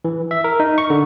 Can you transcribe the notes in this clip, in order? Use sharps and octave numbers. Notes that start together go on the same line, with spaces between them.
E3
E5
A#4
D#4
C#6
D3